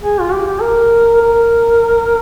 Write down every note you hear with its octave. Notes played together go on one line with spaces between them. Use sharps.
G#4
F4
G4
G4
A#4
A#4